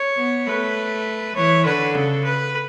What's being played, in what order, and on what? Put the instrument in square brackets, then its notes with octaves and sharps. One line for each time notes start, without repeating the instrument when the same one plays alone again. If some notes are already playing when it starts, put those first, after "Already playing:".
Already playing: [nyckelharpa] C#5
[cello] B3
[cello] A3 [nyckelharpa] B4
[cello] E3 [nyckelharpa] C#5
[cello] D3 [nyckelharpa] B4
[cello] C#3 [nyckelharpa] A4
[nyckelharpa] B4